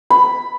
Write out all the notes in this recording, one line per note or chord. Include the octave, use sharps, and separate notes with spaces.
B5